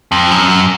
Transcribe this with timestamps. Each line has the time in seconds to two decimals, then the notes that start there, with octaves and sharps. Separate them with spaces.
0.12 F2
0.31 F#2